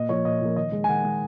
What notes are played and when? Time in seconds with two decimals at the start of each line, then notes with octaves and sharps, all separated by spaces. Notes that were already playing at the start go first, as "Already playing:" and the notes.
Already playing: A#2 D#5
0.09 F3 A#3 C#5
0.25 A#2 D#5
0.41 F3 A#3
0.56 D#3 D#5
0.72 G#3
0.84 G#5
0.89 D#3 F#5
1.04 G#3